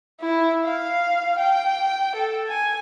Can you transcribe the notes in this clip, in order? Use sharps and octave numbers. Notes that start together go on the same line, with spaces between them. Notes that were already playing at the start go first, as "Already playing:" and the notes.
E4
F5
G5
A4
G#5